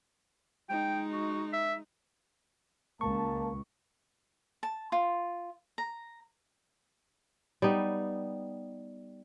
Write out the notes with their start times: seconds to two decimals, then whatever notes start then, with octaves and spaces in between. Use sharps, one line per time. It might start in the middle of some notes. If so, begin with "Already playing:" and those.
0.69 G#3 D#4 G5
1.12 F#4
1.53 E5
3.01 C#2 A#3 A5 C#6
4.63 A5
4.92 F4
5.78 A#5
7.62 G3 B3 D#4